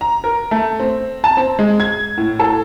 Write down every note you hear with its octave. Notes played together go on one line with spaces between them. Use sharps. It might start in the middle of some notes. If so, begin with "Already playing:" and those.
A#5
A#4
A3
C4
A5
C4
G#3
G#6
A2
A4